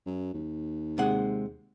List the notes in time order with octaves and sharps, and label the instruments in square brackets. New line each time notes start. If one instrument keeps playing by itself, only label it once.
[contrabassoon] F#2
D#2
[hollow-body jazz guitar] C3 G#3 F#5